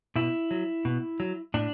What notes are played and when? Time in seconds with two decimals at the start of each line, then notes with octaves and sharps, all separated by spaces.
0.16 B2 E4
0.51 F#3
0.85 B2
1.20 F#3
1.54 A2 D4